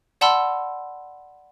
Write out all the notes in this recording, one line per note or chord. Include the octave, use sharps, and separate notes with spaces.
D5 F#5 A5 B5 C6 E6